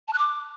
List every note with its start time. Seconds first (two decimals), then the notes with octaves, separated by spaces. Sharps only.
0.08 A5
0.13 F#6
0.18 D6